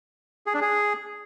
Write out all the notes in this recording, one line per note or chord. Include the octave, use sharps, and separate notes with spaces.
G#4
D4
G#4